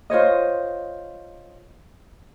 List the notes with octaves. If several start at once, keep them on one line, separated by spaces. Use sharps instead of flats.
F4 C5 C#5 D#5